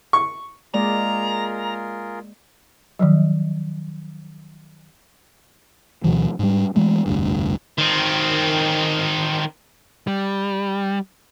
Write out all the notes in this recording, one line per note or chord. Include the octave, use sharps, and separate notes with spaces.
C#6
G#3 A#3 F4 G#4 A#4 D5 A#5
D#3 F3 F#3
D2 B2 E3 F#3
G#2 G3
E3 G#3 A3
F1 D2 G2
D#3 C4
G3